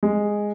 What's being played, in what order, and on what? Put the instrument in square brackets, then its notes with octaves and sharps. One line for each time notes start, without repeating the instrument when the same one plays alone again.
[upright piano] G#3